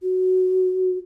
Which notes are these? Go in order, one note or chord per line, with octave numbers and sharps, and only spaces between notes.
F#4